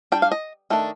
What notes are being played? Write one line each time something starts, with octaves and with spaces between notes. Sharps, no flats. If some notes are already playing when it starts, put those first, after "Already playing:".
G3 D4 G5
F5
D#5
D#3 A3 D4